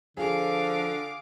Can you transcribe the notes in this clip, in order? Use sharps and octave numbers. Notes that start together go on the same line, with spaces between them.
D3 F3 G#4 F5 D6